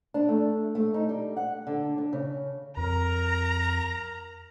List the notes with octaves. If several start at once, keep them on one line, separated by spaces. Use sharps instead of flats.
D4
A3
A3
D#4
G3
F#5
D3
D4
C#3
F2 A#4 A#5